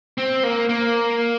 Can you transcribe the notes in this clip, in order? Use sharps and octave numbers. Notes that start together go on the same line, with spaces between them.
C4
A#3
A#3